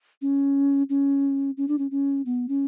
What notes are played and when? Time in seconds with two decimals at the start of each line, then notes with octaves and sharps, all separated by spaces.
0.22 C#4
0.90 C#4
1.57 C#4
1.68 D4
1.78 C#4
1.91 C#4
2.26 B3
2.49 C#4